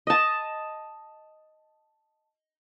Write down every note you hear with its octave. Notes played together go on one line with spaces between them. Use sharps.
D#5 A5